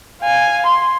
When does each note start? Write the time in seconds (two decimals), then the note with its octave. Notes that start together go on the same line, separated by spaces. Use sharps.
0.22 F5 G#5
0.66 C6